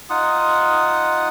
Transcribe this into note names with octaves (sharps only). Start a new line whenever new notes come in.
D#4 F4 F#5 D#6